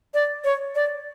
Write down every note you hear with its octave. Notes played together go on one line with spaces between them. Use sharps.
D5
C#5
D5